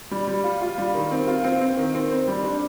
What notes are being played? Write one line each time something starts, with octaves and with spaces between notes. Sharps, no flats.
G3
G3
F4
F4
G3
D#3
C4
F4
C4
C4
D#3
C4
C5
G3
D4